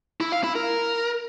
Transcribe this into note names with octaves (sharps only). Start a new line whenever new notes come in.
E4
F5
E4
A#4